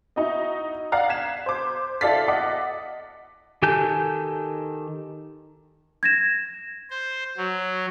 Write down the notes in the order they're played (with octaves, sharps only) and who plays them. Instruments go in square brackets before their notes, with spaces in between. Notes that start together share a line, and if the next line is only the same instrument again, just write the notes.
[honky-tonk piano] D#4 E4 F#4 D#5
D5 F5 F#5 A#5 F#6
G#6 B6 C7 E7
C5 D6
E4 A4 D5 F5 A6 B6
D#5 F#5 D6
[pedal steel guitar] D#3 G4 A4 G#5 G6
[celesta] G#6 A#6 E7
[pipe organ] C5
F#3